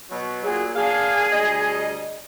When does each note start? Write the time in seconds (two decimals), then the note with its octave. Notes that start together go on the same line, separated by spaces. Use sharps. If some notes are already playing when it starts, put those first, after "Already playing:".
0.10 B2 F#3
0.43 A#2 F#3 G#4
0.74 A#3 D4 G#4 F5
1.31 D2 G3 D#5